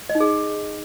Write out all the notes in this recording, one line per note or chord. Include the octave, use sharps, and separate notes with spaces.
D#5
D#4
G#4